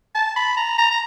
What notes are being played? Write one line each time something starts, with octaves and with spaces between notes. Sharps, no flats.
A5
B5
A#5
A#5
A#5